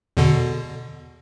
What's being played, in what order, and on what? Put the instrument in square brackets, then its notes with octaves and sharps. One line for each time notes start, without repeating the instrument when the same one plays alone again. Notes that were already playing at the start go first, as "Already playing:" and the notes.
[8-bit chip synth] E2 B2 D3